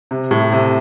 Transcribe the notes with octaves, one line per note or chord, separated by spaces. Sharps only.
C3
A2
C3